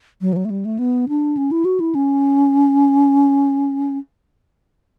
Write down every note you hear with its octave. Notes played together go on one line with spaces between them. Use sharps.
F#3
E3
F#3
A3
G3
A3
B3
D4
C#4
E4
F#4
E4
C#4